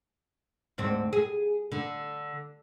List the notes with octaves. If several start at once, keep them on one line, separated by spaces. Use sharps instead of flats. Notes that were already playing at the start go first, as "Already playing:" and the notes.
D2 G#2 C4
G#4
D3